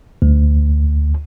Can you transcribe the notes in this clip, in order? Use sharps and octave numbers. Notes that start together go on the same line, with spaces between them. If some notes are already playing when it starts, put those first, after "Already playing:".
D2